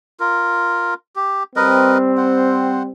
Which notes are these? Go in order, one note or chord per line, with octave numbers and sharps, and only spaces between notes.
F4 A#4
G4
G3 C4 A#4 B4 D#5
C5 F#5